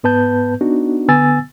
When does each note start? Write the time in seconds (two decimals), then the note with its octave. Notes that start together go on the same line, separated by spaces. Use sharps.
0.04 G#2 B3 B4 A5 G6
0.61 B3 D4 D#4 F#4
1.08 D3 B3 G#5 E6 A6